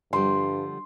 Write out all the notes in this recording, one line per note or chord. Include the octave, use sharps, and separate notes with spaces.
G2 D3 F3 G3 C6